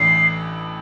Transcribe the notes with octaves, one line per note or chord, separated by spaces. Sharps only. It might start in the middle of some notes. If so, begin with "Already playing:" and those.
Already playing: A1 A2 E3 A3 D4 C7